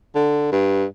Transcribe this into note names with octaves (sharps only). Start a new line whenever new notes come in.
D3
G2